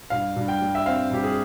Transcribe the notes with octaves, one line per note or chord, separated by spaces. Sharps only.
G2 F5
G2
G5
G3
E5
C4 F5
G2 G4
G#4